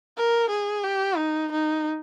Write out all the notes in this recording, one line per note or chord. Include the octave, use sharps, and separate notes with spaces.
A#4
G#4
G4
D#4
D#4